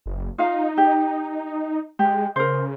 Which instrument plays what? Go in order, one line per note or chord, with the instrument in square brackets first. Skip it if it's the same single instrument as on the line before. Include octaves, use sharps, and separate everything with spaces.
[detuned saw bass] F#1
[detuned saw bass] D#4 [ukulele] F4 F5
[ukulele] G4
[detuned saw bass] G#3 [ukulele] G4
[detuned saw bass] C#3 [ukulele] A#4 C5